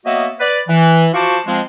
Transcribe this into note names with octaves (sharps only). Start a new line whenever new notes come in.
F#3 A#3 B3 F#4 D#5 E5
B4 D5
E3
F3 F#4 C5 A5 C#6 D6
F3 G#3 C4